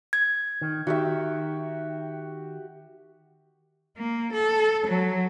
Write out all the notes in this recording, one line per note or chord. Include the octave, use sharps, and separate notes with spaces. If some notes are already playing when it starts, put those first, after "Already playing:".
G#6
D#3
D#3 F#4 G4 E5
A#3
A4
F#3